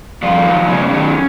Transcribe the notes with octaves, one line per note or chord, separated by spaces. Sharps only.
G2 F3 F4
D#3 F#3
G2 C#3 C#4
D#3 F#3